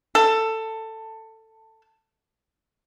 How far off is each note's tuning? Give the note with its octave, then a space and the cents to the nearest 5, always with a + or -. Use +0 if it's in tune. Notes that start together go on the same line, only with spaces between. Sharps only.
A4 +15